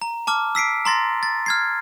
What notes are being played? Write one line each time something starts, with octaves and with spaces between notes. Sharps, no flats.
A#5
A5 D6 F6
E6 B6 C7 D7
A#5 C6 A6 A#6
A6
F6 G#6 C7